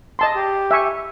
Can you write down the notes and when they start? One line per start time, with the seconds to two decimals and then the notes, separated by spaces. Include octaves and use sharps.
0.19 D#5 A5 C6
0.35 G4
0.71 E5 G#5 C#6